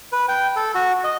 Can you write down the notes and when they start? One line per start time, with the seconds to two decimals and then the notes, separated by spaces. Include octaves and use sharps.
0.12 B4
0.28 G5
0.56 A4
0.75 F#4
1.04 D#5